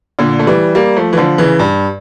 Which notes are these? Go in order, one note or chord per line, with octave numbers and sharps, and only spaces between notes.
A#2 D3
A3
E3 G3
G3 A#3
F3 A3
E3
D3 F3
C#3 E3
G2